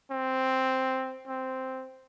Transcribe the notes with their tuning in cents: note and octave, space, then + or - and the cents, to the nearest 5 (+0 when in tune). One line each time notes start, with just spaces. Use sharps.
C4 +0
C4 -5